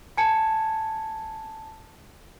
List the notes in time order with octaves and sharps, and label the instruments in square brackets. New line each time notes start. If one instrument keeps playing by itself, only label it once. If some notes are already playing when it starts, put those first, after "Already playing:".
[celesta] G#5 A5 G#6 C#7